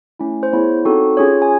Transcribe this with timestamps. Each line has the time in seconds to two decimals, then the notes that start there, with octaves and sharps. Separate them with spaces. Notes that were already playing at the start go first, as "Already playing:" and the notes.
0.19 A3 C#4 E4
0.43 C5
0.53 B3 E4 G#4 C#5
0.85 C4 D#4 F#4 A4
1.17 C#4 F4 G#4 C#5
1.42 G#5